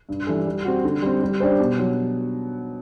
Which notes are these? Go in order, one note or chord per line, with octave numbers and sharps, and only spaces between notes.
G2
E3 G3 D4 A4
G3
C4 F#4
D3
G3 C4
G3
D4 G4 C5
B2
F#3